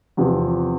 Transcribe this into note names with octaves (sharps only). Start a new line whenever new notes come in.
E2 C3 F3